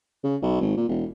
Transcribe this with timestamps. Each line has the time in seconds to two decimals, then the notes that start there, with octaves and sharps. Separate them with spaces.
0.24 C#3
0.42 B1
0.61 G#1
0.77 A#2
0.89 E1